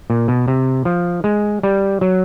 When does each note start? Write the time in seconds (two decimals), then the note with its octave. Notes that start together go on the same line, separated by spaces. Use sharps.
0.10 A#2
0.28 B2
0.48 C3
0.85 F3
1.24 G#3
1.63 G3
2.01 F#3